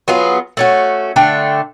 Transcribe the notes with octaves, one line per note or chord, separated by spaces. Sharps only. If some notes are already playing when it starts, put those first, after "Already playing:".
F#3 B3 F4 G#4
A3 C#4 F#4
D3 A3 D4 G5